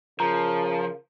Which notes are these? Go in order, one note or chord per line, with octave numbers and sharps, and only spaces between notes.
C#3 F3 A#4 A#5